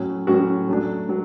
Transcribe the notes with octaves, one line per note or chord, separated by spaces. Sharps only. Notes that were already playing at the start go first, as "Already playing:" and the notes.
Already playing: A2 F#3 C#4
A2 F#3 C#4 F#4
F#3 A3 D4
F#3